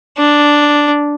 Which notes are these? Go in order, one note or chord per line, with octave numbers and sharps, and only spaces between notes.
D4